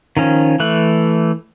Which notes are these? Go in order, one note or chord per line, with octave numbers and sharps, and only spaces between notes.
D#3 F3 C#4
E3 A3 F#6